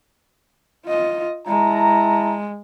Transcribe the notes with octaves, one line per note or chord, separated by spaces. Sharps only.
F4 D#5
G#3 E4 A5 A#5